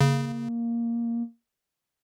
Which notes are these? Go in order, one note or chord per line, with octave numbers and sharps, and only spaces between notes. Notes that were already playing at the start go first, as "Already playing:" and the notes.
C#3 A#3